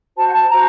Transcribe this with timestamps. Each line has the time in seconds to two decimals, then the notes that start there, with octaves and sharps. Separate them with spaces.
0.16 F#4 C5 A5
0.26 F#5
0.34 A5
0.52 F#4 C5 A#5